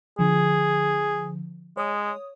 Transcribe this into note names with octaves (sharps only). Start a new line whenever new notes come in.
D3 F3 G#4
G#3 C#5 D#6